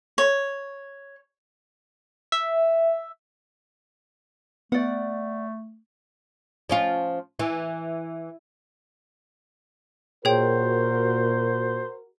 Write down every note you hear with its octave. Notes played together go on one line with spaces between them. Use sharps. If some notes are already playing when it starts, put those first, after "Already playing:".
C#5
E5
A3 B3 D5 F#5
F3 C#4 F4
E3
A#2 F#4 G#4 A#4 C5 C#5 G5